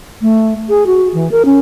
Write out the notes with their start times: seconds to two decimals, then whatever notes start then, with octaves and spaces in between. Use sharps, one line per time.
0.22 A3
0.69 G#4
0.87 F#4
1.14 E3
1.32 A#4
1.45 C#4